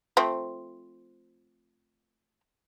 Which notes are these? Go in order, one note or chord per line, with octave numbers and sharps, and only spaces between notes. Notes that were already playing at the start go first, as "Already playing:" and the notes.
F3 A3 C4